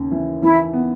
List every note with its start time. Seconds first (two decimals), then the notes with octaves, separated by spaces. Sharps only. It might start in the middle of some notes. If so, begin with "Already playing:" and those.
Already playing: D#2 C#3
0.11 E3
0.42 E3 E4
0.73 B3